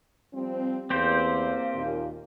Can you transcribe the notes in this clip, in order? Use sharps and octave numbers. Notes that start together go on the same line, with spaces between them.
F3 G3 C4
E2 A#3 C4 G4 C5
D#2 A#2